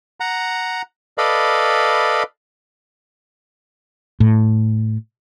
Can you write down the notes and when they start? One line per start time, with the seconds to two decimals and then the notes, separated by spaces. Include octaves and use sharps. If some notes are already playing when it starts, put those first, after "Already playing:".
0.20 F#5 A#5
1.18 A4 B4 D5 D#5 F5 B5
4.20 A2